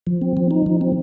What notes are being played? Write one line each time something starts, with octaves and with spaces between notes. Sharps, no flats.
F3
C4
F3
D#4
F3
C4